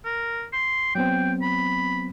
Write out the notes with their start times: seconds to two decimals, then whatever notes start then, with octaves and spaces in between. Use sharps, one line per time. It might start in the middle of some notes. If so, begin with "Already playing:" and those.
0.05 A#4
0.53 C6
0.95 F#3 B3 C4 G5
1.42 B5